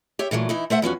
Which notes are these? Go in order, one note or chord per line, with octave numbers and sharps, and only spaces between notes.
G4 C#5 E5
A#2 E3 F#3 A3
E3 D#4 E4
A3 C5 E5 F#5
E2 F3 C#4 F#4